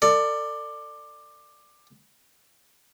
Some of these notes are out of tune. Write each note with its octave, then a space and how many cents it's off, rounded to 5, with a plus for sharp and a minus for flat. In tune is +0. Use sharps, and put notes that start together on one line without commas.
A4 +40 D5 +15